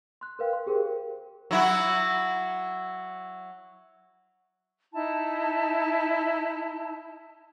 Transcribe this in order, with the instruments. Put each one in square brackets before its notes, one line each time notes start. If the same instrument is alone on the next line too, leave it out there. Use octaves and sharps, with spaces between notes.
[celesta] C6 F#6
A#4 B4 F5 G5
C6
G4 G#4 A#4 C5 G5
[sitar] F#3 E4 F#4
[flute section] D#4 E4 A5